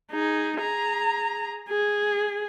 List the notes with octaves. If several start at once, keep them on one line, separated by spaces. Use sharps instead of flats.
D#4 G#4
G#4 A#5
G#4